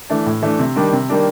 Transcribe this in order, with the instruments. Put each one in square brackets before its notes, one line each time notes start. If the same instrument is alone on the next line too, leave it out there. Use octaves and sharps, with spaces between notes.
[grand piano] E3 A3 D4
A2
E3 A3 D4
C3
D#3 G3 A#3 D4
C3
D#3 G3 A#3 D4